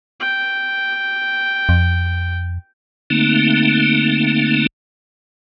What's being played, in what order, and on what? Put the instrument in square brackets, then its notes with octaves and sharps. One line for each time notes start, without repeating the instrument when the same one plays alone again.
[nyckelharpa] G5
[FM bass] F2
[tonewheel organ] D3 A3 A#3 C4 D#4